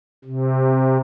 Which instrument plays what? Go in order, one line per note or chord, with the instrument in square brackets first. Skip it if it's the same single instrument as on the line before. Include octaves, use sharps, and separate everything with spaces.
[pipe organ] C3